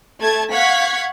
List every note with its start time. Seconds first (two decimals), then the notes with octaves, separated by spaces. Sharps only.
0.21 A3 A5 G#6
0.52 F5 F#5 C#6 G#6 B6